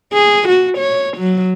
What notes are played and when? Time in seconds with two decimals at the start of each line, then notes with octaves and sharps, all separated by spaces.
0.13 G#4
0.48 F#4
0.78 C#5
1.18 F#3